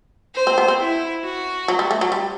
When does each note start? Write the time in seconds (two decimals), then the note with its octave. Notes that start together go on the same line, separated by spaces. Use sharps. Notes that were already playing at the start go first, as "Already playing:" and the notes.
0.35 C5
0.47 C4
0.58 B3
0.68 C4
0.80 E4
1.24 F#4
1.68 F#3
1.79 G3
1.91 A3
2.01 F#3
2.12 G3